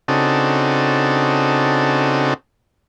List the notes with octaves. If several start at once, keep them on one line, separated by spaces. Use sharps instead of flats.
C#3 C4 D4 D#4 F#4 A4